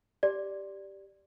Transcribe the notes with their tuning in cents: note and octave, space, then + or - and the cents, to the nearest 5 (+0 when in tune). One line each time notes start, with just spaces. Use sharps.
G4 +0 D5 +0